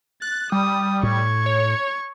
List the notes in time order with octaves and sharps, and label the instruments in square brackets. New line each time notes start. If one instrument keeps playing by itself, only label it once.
[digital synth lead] F#6 [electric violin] A6
[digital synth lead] G3 [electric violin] D#6
[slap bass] A2 [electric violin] C#6 G#6
[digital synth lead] C#5